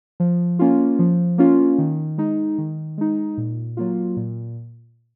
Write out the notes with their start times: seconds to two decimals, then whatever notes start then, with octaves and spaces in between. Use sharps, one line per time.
0.20 F3
0.59 A#3 C#4 F4
0.99 F3
1.38 A#3 C#4 F4
1.78 D#3
2.18 G#3 D#4
2.58 D#3
2.98 G#3 D#4
3.38 A#2
3.77 F#3 A#3 F4
4.17 A#2